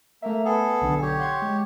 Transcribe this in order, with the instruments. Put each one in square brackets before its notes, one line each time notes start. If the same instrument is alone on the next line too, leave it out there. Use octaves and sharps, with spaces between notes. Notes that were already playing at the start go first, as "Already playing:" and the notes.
[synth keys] A3 E5 [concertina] A#3
[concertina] B3 G#4 A4
[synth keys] B1 D3 D4
[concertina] G4 C#5
[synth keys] F#5 C6 G#6
G#3